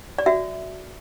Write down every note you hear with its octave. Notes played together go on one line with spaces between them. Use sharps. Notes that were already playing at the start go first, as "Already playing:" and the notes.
D5
F#4 E5